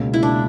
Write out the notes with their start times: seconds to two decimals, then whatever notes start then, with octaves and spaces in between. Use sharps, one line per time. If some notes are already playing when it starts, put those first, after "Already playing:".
Already playing: C#2 B2 A#3 C#4
0.14 E4
0.23 D4